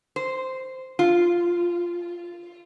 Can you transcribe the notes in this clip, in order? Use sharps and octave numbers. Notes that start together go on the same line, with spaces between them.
C5
F4